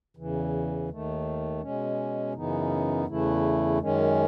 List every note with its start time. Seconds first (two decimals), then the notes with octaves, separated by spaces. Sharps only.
0.17 E2 C#3 E3
0.88 D#2 D#3 A3
1.61 B2 G#3 C#4
2.33 F#2 C#3 E3 B3 D#4
3.06 E2 C#3 E3 A3 E4
3.78 F#2 D#3 G#3 C#4